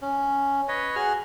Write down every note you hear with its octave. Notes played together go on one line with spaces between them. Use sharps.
C#4
B4 C#5 D#5
F#4 G#4 F6